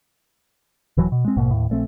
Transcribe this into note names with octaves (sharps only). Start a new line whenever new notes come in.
D#1 E3 F#3
B2
G#3 C4
A#1 G#2 B2 A#3
D#2 A2
A#1 A3 C4